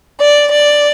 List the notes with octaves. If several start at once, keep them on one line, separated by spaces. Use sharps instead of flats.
D5
D5